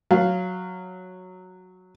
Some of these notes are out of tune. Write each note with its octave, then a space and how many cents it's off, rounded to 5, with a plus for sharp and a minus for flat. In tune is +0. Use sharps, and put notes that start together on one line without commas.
F#3 -10 F5 +0